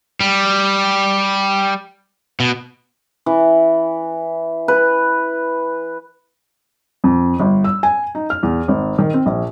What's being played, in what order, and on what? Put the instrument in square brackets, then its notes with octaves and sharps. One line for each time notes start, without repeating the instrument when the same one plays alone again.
[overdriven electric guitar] G3
B2
[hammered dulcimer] E3
B4
[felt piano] F2
G1
E6
G#5
D#4
F6
E2
G#1
D#3
C4
A#1